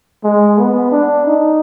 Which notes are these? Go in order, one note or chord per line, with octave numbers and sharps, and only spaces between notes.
G#3
B3
D4
D#4